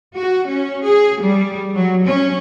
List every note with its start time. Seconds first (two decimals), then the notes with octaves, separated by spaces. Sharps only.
0.16 F#4
0.48 C#4
0.86 G#4
1.23 G3
1.75 F#3
2.06 C#4